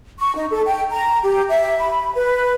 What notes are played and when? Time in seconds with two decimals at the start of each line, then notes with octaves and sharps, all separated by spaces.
0.19 C#6
0.35 D#4
0.51 A4
0.66 G5
0.90 A#5
1.22 G4
1.49 E5
1.78 B5
2.14 B4